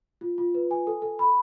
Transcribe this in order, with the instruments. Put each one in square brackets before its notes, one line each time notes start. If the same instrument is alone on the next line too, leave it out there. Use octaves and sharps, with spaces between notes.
[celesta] F4
F4
B4
G#5
A4
A4
B5